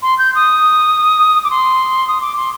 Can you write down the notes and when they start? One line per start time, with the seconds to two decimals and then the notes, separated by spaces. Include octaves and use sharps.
0.02 C6
0.19 G6
0.35 D#6
1.44 D6
1.51 C6
2.08 D#6
2.21 D6
2.36 C6